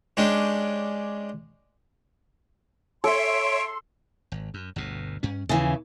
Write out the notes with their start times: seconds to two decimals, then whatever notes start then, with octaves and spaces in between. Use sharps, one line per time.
0.17 G#3 C#4 D4 G4
3.04 A4 C#5 E5 C6 D7
4.32 G#1
4.54 F#2
4.76 G1 D2 B2
5.23 G2 C#4
5.49 D#2 C#3 E3 F3